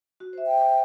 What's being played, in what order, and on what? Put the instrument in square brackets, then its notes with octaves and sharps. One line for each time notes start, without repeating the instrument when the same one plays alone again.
[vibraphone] F#4
C5 E5
[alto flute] G5